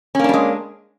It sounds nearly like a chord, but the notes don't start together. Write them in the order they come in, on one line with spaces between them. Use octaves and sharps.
C#4 A#3 D4 G3 G#3